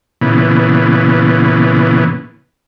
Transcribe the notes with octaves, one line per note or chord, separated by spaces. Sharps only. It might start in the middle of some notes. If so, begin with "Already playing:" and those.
A#2 C#3 E3 B3